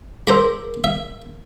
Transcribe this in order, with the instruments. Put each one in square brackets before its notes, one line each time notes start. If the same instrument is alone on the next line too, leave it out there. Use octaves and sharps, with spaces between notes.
[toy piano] G#4 A#4 [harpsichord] C5 A#5 B5
[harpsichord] E5